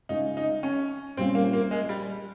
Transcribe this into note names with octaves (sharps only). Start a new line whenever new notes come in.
C#3 G#3 C#4 D#4 F4
D#4
C#4
A#2 G3 C4 C#4 F4
A#3
A#3
G#3
G3